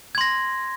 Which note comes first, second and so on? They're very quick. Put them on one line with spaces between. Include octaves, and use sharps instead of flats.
G#6 C6 A#6